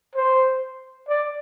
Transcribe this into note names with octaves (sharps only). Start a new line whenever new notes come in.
C5
D5